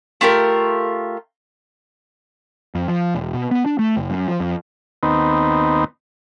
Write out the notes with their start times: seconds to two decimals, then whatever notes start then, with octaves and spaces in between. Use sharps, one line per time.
0.21 A3 F4 G4 A#4
2.75 F2
2.88 F3
3.15 E1
3.34 B2
3.51 B3
3.66 D4
3.79 A3
3.97 F#1
4.10 F#2
4.28 F3
4.40 F2
5.03 D#2 B3 C4 D#4